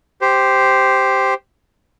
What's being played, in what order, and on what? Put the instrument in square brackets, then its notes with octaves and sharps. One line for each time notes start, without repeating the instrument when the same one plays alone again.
[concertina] G4 C5